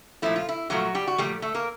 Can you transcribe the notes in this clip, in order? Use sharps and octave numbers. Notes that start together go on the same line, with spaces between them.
A#2 F3 A3 E4
F4
E4
A#2 F3 F#3 A3 F#4
G3 G4
F#4
A#2 F3 G3 A3 G4
A3 A4
A#3 A#4